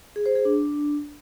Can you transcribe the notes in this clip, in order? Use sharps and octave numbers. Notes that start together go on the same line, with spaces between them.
G#4
C5
G#4
D4